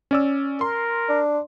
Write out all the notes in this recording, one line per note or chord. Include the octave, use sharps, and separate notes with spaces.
C#4 D5 E6
A#4 C6
D4